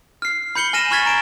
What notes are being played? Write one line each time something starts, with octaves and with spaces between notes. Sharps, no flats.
F6 C7
B5 G6 C#7 F#7 G7
G#5 F6 A#6 D#7 E7
B5 C#6 F6 G#6 A6 B6
A#5 D7 E7